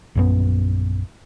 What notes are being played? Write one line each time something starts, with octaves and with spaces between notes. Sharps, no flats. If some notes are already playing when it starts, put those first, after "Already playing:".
A#1 F#2 B3